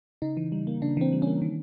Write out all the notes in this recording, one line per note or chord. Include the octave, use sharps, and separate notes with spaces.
C#3 D#4
E3
G3
A#3
C#3 D4
E3 C4
G3
C#4
A#3
D#3